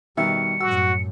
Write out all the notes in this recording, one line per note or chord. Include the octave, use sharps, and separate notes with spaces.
B2 D#3 G3 E5 C#7
F#2 A2 F#4 E6